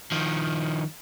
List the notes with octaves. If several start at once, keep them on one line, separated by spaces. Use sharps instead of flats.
D#3 F3